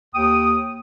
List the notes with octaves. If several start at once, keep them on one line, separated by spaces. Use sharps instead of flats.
D#2 G5 D#6